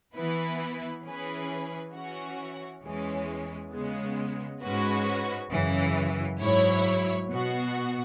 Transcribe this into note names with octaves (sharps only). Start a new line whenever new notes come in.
E3 B3 E4 B4
E3 C#4 G#4 B4
E3 C#4 F#4
E2 E3 G#3 C#4
C#3 G#3 B3
G#2 G#3 C#4 F#4 B4
F#2 C#3 E3
G#2 F#3 E4 C#5
B2 B3 F#4